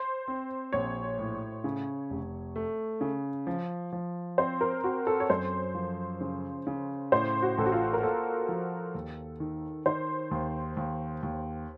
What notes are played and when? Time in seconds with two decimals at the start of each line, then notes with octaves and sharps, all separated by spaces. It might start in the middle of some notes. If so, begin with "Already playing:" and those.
Already playing: C5
0.28 C4
0.73 A#1 C#5
1.19 A2
1.64 C#3
2.10 F1
2.56 A3
3.01 C#3
3.47 F3
3.93 F3
4.38 C4 C5
4.61 A#4
4.84 C4 F#4
5.07 A4
5.20 C#5
5.30 F#2 C5
5.75 F3
6.21 C#3
6.67 C#3
7.12 A2 C5
7.42 F#4
7.58 A1 A4
7.66 F#4
7.72 F4
7.93 A#4
8.03 A#3 A4
8.49 F3
8.95 D#2
9.40 D#3
9.86 D#3 C5
10.31 D#2
10.77 D#2
11.23 D#2